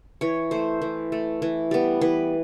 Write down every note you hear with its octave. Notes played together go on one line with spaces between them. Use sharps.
E3 C#5
A3 C5
E3
A3
E3
G3 B3
E3 B4